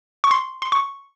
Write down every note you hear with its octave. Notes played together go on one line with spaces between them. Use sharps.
C#6
C6
C6
C#6